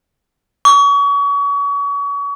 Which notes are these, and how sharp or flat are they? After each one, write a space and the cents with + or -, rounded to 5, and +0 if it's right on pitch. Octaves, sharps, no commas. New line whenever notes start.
C#6 +35